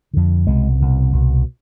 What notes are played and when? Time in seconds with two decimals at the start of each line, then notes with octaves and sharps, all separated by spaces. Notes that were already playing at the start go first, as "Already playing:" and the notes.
0.13 F2 D3
0.47 C2 B2 G#3
0.80 C2 B2
1.13 C2 B2